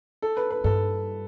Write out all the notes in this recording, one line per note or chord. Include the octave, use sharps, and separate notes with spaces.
A4
B4
B4
G2 A4